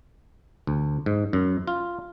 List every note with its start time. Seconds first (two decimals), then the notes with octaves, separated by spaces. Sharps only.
0.67 D2
1.06 G#2
1.33 F#2
1.67 F4